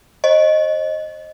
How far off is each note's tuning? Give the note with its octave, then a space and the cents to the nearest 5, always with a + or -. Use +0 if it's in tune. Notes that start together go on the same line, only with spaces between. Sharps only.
C5 +35 D#5 -5